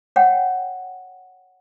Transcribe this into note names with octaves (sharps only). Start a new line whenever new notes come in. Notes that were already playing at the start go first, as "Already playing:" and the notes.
C#5 F#5 G5